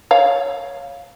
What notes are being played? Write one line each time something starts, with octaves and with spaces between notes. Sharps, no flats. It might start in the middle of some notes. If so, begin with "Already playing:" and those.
C#5 F5